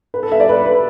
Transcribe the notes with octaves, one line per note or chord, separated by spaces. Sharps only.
B4
A4
E5
D5
B4
B4